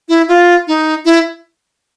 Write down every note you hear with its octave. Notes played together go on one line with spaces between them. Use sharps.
E4
F4
D#4
E4